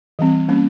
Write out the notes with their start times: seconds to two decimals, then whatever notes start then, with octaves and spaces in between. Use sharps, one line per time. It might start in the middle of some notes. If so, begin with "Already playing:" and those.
0.19 E3 G3 C4
0.48 G3 A#3 C#4